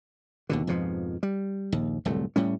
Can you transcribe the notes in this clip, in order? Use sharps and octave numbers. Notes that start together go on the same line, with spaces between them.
D#2 B2 D3
F2 G#2 B2 F3
G3
A#1 D#2
D1 C2 F2 A3
A2 G3 C#4